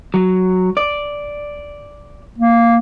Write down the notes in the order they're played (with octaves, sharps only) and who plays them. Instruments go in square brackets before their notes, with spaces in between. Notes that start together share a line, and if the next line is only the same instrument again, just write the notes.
[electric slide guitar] F#3
D5
[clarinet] A#3